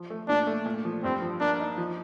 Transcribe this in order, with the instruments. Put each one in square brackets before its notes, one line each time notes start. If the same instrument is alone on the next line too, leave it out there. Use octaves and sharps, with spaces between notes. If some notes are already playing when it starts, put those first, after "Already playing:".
Already playing: [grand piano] F3
A3
[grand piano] A#2 [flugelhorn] D4
[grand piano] A3
A#2
F3
[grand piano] G2 [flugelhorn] C4
[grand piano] F3
[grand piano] A#3 [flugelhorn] D4
[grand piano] D#4
F3